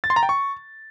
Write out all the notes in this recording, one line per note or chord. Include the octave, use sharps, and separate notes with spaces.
A6
C6
A#5
G5
C#6